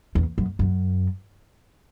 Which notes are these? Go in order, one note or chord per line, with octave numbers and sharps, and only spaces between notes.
E2
F#2
F#2